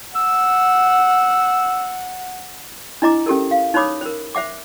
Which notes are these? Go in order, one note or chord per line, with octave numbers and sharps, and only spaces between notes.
F#5 E6
D4 E4 D#5 A#5 D6
C#4 G4 A4 A#4
F5
D#4 C5 C#5 B5 D6 D#6
A#4 C5
C5 E5 F#5 D6